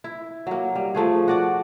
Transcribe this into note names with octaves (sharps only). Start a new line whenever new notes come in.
E4
F#3 A#3
G3
F3 A3 G#4
F#4 D5 F#5